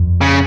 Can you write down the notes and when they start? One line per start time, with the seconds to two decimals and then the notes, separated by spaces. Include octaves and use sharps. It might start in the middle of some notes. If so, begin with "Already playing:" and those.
Already playing: F2
0.22 C#3